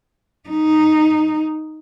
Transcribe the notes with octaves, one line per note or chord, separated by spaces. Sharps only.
D#4